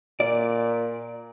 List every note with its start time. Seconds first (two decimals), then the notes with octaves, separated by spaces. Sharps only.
0.20 A#2 D5